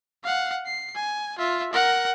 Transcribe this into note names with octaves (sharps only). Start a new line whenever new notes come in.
F5 F#5
C7
G#5
F4 E5
A#4 F#5